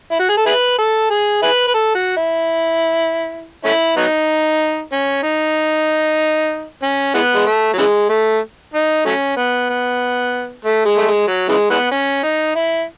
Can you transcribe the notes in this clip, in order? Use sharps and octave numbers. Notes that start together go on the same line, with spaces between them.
E4
F#4
G#4
A4
E4 G#4 B4
A4
G#4
E4 G#4 B4
B4
A4
F#4
E4
A3 C#4 E4
F#3 B3 D#4
C#4
D#4
C#4
E3 G#3 B3
G#3
A3
F#3
C#3 E3 G#3
A3
D#4
F#3 A3 C#4
B3
B3
A3
G#3
A3
G#3
F#3
C#3 E3 G#3
E3 G#3 B3
C#4
D#4
E4